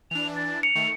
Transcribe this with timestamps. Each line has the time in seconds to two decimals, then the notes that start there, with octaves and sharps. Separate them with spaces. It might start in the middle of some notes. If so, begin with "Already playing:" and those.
0.11 E3 D4 F7
0.36 A6
0.63 C#7 F7
0.75 D#3 A3